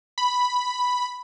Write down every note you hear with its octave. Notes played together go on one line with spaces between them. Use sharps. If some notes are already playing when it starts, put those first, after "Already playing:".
B5